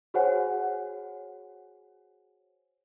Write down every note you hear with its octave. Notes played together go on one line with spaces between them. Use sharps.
F#4 G#4 C5 C#5 F#5 G#5